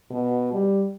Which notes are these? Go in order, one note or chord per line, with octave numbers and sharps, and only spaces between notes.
B2
G3